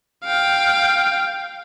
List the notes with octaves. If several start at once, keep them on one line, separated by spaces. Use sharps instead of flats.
F5 G5